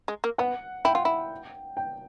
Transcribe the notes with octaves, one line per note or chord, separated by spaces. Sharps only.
G#3
A#3
B3 F#5
E4 G5
F4
E4
G5